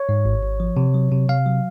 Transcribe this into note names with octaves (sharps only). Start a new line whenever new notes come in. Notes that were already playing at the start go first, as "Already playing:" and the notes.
Already playing: C#5
G#2
G#1
G#1
F3
C3
F#3
C3
C3 F5
F#3